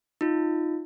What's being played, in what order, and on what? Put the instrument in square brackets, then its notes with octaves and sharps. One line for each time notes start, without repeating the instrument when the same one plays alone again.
[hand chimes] D#4 F4